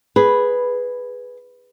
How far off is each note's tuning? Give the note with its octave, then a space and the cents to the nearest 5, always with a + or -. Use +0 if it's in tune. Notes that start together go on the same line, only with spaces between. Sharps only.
G#4 +0 B4 +0